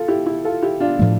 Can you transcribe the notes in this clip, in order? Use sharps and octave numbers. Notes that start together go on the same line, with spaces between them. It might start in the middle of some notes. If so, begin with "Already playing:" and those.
Already playing: F4 A4
E4 G4
E4 G4
F4 A4
E4 G4
D4 F4
A2 F3 A3